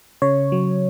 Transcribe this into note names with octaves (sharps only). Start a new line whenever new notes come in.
C#3 C#5
F#3